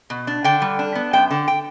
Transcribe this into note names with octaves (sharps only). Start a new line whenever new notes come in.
B2
D4
D3 G5
G3
D4
B3
F#2 G5
D3
G5